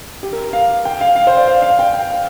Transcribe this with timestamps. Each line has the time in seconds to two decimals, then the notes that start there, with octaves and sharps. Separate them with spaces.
0.23 G4
0.33 A#4
0.53 F5
0.85 G5
1.01 F5
1.16 F5
1.27 C5
1.37 D5
1.47 F5
1.62 F5
1.79 G5
1.93 G5
2.10 F5